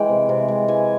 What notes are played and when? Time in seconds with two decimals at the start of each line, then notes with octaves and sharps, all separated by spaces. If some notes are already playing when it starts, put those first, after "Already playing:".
Already playing: E3 G#3 G5
0.09 C3
0.29 C3
0.48 G#3
0.68 E3 G#5